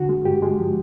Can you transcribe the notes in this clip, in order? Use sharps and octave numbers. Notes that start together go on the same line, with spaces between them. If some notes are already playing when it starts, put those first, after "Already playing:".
Already playing: D3 F#4
G#3
G2 G4
G#3
F3